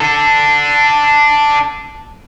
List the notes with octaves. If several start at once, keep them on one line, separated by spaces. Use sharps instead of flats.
D4 A4